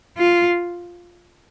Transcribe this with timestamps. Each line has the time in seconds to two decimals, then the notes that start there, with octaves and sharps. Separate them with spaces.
0.18 F4